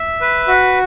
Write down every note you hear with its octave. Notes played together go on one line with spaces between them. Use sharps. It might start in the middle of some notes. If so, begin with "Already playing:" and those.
Already playing: E5
B4
F#4